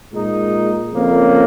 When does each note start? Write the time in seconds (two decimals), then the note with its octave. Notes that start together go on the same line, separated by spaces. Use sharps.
0.13 A#2 G#3 D#4
0.93 F2 C#3 A#3 C#4